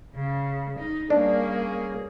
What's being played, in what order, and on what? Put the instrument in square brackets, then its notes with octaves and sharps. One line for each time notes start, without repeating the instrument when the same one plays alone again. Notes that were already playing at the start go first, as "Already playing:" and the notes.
[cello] C#3
D#4
[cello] G3 A#3 [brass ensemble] C#4 G#4 [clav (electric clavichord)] D4